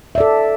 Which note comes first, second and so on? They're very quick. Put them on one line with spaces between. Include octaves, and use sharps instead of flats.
E5 D5 A4